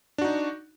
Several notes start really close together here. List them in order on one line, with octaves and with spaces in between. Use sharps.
D4 F#4 D#4